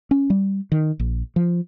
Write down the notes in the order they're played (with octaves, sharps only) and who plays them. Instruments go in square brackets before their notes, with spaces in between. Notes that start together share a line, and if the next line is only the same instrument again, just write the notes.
[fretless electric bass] C#4
G3
D#3
A#1
F3